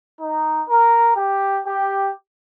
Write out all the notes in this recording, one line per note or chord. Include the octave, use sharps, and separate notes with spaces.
D#4
A#4
G4
G4